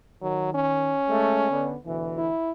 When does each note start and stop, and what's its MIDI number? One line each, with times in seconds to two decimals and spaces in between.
0.22 0.95 51
0.22 0.53 54
0.54 1.72 61
1.09 1.47 56
1.09 1.47 57
1.50 1.76 50
1.50 1.76 59
1.85 2.31 38
1.85 2.31 47
1.85 2.31 52
2.18 2.51 64